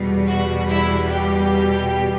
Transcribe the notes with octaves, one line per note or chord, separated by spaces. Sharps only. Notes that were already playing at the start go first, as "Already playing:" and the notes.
Already playing: E2 B2 G3
F#4
E4
G4